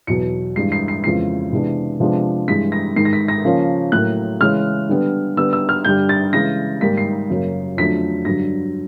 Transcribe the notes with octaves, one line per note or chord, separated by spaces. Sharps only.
E2 B2 F#3 B3 C#7
G2 E3 G#3 C7
C7
C7
F2 C#3 E3 G#3 B3 C7
C3 E3 G#3 B3 D4
C3 F3 G#3 B3 D4
G2 E3 G#3 B6
A#6
G#2 D#3 G#3 C7
A#6
B6
A#6
C#3 F3 A#3 C#4
A2 F#3 A#3 F#6
C#3 E3 G#3 C#4 F6
D3 G3 B3
D3 G3 B3 E6
E6
F6
G2 D3 G3 G6
A6
C#3 E3 G#3 A#6
G#2 D#3 G3 A#3 B6
C7
F#2 C#3 F#3 A#3 C#4
F2 D3 F#3 A3 B6
G2 D3 F#3 A#6